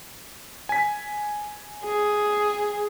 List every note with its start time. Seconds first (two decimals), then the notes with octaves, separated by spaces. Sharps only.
0.69 G#5 B6
1.84 G#4